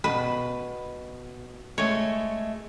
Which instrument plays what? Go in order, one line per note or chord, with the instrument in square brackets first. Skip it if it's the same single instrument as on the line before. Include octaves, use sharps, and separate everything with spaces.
[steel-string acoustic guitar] B2 [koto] B4
[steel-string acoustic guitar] G#3 A3 [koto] C#5